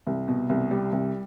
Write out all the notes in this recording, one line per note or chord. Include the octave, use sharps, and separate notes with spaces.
C2
B2
C2
G3
C2